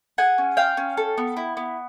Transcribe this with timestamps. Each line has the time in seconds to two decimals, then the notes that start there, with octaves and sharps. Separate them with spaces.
0.18 G#4 F#5 G#5
0.38 C#4
0.57 F4 F5 G5
0.77 C#4
0.97 A4
1.18 B3
1.37 E4
1.57 B3